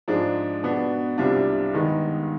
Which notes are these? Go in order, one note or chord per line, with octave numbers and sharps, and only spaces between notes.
G#2 F3 G#3 D4
B2 B3 D4
C2 C3 G3 D4 F4
G2 D#3 G#3 B3 D#4